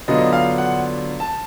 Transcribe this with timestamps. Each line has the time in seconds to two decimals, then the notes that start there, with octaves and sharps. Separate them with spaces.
0.08 D3 F#3 B3 D4 F4 D#5
0.33 F5
0.58 F#5
1.20 A5